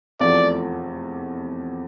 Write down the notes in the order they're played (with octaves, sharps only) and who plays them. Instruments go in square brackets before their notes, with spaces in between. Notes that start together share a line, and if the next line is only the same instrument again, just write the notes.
[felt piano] F1 E2 C3 F3 A3 [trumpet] D5